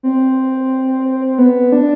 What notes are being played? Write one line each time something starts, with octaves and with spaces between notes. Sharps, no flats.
C4
B3
D4